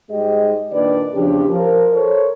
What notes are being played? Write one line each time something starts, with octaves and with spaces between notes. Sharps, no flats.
G#2 G3 G#3 G4 G#4 D#5
A#2 D#3 D4 B4 D5
E2 C#3 F3 D4 G4
F3 A#4
A4 A#4 C5 C#5